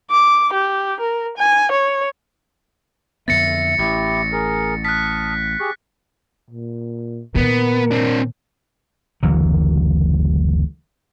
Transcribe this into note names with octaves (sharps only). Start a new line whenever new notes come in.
D6
G4
A#4
G#5
C#5
F2 D3 B3 E5 A6 A#6 C#7
A1 E4 G4
G#4 A#4
A5 D#6 F6 F#6 B6
G4 G#4 C#6
A#2
A#2 D#3 B3 A#4
C4 D4
F#1 D2 E3 F#3